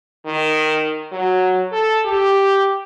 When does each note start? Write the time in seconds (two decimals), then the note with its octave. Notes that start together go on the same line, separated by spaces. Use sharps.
0.26 D#3
1.12 F#3
1.72 A4
2.05 G4